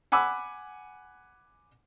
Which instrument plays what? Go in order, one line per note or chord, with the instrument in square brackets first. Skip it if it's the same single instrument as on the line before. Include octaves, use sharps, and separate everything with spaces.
[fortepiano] F#5 G#5 B5 D6 E6